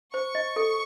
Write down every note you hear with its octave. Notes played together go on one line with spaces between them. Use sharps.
C5 C#6
D#5
A4